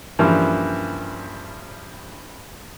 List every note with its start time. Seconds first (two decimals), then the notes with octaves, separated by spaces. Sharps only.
0.19 G2 C#3 E3 F3 A#3